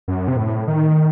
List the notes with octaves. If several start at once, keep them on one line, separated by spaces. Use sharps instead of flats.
F#2
C3
A2
D#3